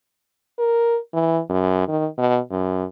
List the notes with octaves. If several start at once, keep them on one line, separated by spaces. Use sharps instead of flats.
A#4
E3
F#2
D#3
B2
F#2